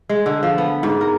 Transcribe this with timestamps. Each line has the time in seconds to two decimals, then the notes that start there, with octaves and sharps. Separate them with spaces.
0.09 G#3
0.26 D3
0.43 F3
0.58 B3
0.83 G#2
1.01 A#4